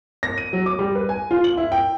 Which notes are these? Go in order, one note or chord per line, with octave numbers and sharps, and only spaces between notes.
A#6
D#7
F#3
D6
G3
B4
G#5
F4
F#7
E4
G5